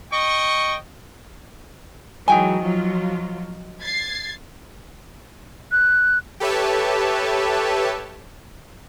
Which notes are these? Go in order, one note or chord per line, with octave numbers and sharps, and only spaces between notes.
D#5 G5 C#6
E3 F#3 G#3 D#4 G5 G#5
F3 F#3 F4
G#6 A6 C7
F#6
G4 A4 B4 C#5 E5 A5